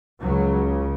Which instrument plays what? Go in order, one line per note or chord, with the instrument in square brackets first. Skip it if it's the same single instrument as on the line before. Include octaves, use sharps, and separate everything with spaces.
[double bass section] C#2 C#3 F#3